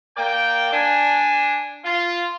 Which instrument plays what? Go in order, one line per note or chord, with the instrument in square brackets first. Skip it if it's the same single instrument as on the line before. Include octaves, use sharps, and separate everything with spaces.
[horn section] A#3 A#4 D5 G5
D4 G#5
F4